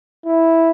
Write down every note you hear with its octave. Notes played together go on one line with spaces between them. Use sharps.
E4